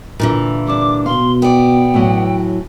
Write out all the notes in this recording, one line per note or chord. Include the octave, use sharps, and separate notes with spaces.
A#2 D3 E3
G3 D4 D6
B2 F5 C6
B3 D5 G5
A2 E3 F#3